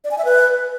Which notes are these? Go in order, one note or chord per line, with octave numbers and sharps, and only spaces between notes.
D5
G#5
E5
B4